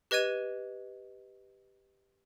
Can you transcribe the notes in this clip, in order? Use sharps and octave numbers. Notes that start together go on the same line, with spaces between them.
G4 B4 D#5 G#6 D#7